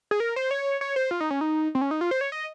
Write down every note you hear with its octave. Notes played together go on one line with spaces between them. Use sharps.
G#4
A#4
C5
C#5
C#5
C5
F4
D#4
C#4
D#4
C4
C#4
D#4
F4
C5
C#5
D#5